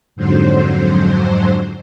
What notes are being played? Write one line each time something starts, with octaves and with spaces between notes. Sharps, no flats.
F2 G#2 D3 F#3 C5